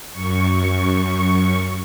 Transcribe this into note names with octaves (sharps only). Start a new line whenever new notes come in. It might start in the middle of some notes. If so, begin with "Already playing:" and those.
F#2 C#6